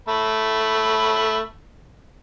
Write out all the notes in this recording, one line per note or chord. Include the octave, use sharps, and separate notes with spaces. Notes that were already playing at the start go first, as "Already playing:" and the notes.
A3 B5